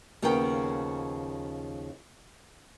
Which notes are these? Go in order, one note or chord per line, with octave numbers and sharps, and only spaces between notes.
D#2 C#3 F3 B3 A#4 G5